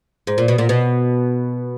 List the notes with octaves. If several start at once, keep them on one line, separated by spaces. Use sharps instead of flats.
G#2
A#2
B2
A#2
B2